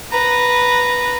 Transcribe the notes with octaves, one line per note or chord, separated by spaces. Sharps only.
B4 A#5